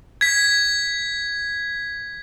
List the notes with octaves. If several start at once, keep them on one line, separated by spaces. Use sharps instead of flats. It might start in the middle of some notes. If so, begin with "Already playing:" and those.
G#6 B6